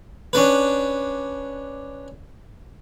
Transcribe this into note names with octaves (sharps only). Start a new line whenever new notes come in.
C#4 D4 B4